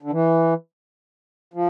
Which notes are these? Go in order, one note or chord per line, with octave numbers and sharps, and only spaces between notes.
D3
E3
F3